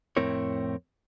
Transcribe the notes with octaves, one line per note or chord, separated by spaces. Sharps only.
F2 A2 C4 E4 A#4 C#5